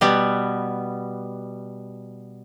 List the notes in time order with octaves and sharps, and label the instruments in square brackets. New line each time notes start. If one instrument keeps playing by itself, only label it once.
[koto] B2 G3 B3